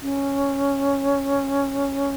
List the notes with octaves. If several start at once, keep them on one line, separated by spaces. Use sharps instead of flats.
C#4